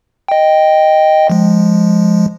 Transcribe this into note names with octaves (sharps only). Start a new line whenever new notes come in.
D#5 G5
F3 G#3